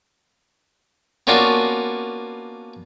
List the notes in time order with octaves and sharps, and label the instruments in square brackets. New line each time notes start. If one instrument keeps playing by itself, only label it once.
[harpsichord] A#3 B3 C#4 D4 F4 F#4